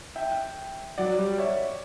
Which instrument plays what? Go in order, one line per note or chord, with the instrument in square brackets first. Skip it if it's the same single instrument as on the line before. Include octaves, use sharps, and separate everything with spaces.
[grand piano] E5 G5
[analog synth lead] F#3 [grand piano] D5 F#5
[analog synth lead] G3
[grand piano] C#5 E5